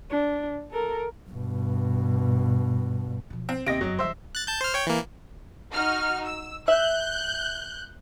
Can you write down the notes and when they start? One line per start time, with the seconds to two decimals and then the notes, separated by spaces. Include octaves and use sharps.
0.10 D4
0.71 A4 A#4
1.30 G2 B2
3.30 B2 F3
3.49 C4
3.66 D#2 C3 D#5 A#6 D7
3.81 F1 F#2 F#3
3.99 E3 G3 C5 E5
4.35 F#6 A6
4.47 A5 G6
4.61 C5 F6
4.74 C#5 G5
4.87 E3 A#3
5.71 D#4 F#4 F6
6.25 E6
6.68 E5 F#6 G6